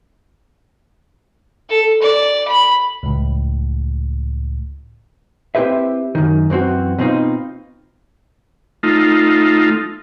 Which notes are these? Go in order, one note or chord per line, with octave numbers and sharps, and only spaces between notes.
A4
D5
B5
C#2 A2
C4 E4 G4 B4 E5
F#2 D#3
F#2 E3 C4 F#4
B2 C4 D#4 F4
A3 D#4 F4